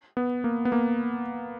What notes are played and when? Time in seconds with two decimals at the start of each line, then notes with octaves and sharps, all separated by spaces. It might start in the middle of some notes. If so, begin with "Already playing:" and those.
0.17 B3
0.44 A#3
0.65 B3
0.72 A#3